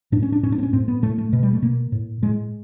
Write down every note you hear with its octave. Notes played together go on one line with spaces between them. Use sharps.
A2 D4
C#4
D4
A2 C#4
D4
C4
C#4
A2 C4
B3
A2 A3
A3
B2
G3
A3
B2 A#3
A2
A2 G#3